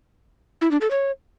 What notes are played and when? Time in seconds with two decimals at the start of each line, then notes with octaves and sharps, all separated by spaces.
0.61 E4
0.71 D4
0.81 A4
0.91 C#5